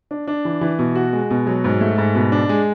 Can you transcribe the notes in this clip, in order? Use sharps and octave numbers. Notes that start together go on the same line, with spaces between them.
D4
D4
E3
E3
B2
F#4
G#3
B2
F#3
G#2
A3
G#2
B2
D4
G#3